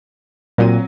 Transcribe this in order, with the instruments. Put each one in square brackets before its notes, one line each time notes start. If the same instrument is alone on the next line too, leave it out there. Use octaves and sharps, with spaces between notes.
[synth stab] A#2 [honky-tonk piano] F#3 C4 D#7